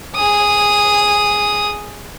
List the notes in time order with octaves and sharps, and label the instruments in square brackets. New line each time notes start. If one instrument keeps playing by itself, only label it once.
[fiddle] G#4 D#6